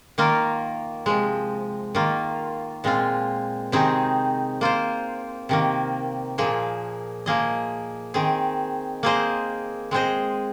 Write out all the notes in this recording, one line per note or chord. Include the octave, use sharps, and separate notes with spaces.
D#3 A#3 F4 A#4
C3 F3 G#3
D#3 A#3 F4
A#2 G#3 C4 F4
C3 D#3 C4 D#4 G#4
A#3 F4 C5
C3 D#3 A#3
A#2 F3 A#3 G#4
F3 A#3 G#4 D#5
D#3 C4 G#4
A#3 G#4 C5 D#5
G#3 C4 G#4 C5 D#5